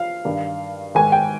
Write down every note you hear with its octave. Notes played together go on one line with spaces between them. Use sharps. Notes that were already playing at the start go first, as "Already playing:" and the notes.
Already playing: F3 F5
G2 D#3
G#2 D#3 G#5
G5